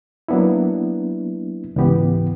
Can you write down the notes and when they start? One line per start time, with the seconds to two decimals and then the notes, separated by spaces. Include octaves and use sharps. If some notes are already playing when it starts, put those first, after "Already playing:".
0.28 F#3 A#3 B3 D4 E4
1.76 C#2 G#2 E3 B3 G4